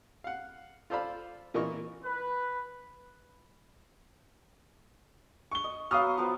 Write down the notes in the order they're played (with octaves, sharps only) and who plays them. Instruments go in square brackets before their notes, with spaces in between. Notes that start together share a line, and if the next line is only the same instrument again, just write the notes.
[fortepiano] F5 F#5
F4 A4 C5 D5 F5 B5
A#2 E3 A#3 A#4 D#5 C#6
[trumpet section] B4
[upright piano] C#6 G7
[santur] D#5
[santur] F#3 B3 F#4 [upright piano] F5 D#6 F6
[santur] F3 B3 B4